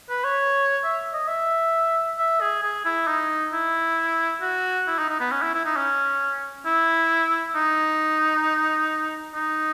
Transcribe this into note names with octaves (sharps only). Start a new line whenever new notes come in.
B4
C#5
E5
D#5
E5
E5
G#4
G#4
E4
D#4
E4
F#4
E4
D#4
D#4
B3
C#4
E4
E4
D#4
C#4
E4
D#4
D#4